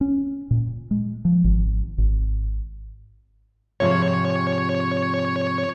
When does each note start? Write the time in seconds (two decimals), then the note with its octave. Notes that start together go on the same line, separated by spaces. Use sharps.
0.01 C#4
0.51 A#2
0.91 G#3
1.25 F3
1.44 G#1
1.98 G#1
3.80 G#2 C3 F3 C#5